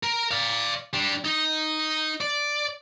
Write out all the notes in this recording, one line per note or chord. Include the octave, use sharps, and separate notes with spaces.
A#4
D5 F5
G3 D4
D#4
D5